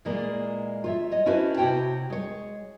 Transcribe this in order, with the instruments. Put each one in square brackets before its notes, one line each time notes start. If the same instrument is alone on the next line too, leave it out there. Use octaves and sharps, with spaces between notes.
[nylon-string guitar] A#2 E3 G#3 A#3 D5
F4 C#5 E5
C#5 D#5
C#4 D4 E4 F#4 B4 C5
C3 E4 F#4 C#5 G5 A5
G#3 C#5